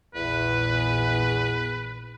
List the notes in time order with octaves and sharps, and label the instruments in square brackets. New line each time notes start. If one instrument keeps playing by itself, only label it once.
[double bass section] A#1 [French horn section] E2 [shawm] B4